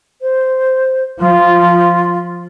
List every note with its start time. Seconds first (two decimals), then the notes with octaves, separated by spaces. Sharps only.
0.21 C5
1.18 F3 F4